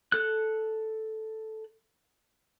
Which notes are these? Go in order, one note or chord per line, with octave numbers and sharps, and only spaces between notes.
A4 F#6